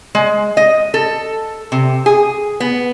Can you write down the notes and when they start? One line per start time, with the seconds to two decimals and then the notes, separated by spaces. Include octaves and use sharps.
0.15 G#3
0.57 D#5
0.94 A4
1.72 C3
2.06 G#4
2.60 B3